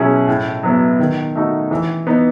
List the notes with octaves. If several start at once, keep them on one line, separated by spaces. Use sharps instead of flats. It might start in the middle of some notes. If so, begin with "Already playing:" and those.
Already playing: B2 F#3 C#4 E4 G#4
A2
F#3 B3 E4
D#3
A3 D#4 F#4
E3
B3 D#4